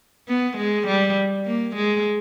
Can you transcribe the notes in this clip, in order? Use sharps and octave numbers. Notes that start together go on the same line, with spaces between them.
B3
G#3
G3
A#3
G#3